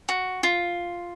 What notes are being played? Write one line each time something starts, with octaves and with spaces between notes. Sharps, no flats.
F#4
F4